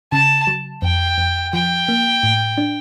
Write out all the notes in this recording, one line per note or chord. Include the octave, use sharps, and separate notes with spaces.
C#3 A5
F#3
F2 G5
F2
F3 G5
A#3
A2
D4